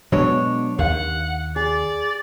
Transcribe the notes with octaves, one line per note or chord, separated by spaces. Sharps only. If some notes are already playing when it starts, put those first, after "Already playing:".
B2 F#3 G#3 D4 C#5
D#2 F5 F#5
G#4 D5